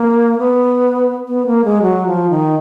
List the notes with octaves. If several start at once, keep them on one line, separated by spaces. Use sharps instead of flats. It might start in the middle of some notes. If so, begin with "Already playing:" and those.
Already playing: A#3
B3
B3
A#3
G#3
F#3
F3
D#3